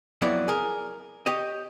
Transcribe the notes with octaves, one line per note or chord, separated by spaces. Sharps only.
F2 F#3 B3 E4 D5
G#4 A#4
G4 C#5 D#5